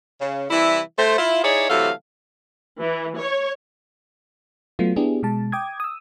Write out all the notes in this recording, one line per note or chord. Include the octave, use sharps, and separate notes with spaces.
C#3
C3 E3 G3 E4
A3 C5
E4 F4
D#4 E4 G#4 C#5 D5
C3 E3 F#3 A3 A4 F5
E3
C#5
F#3 A3 B3 F4
B3 D4 E4 G4 G#4
B2 G#3 A5
G5 D6 D#6 G#6
D#6 E6